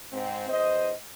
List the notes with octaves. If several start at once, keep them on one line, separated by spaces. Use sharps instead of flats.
G#2 C4
E2 C5 D#5